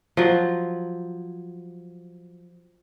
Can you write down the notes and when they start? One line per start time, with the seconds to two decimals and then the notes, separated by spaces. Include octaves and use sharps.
0.17 F3 F#3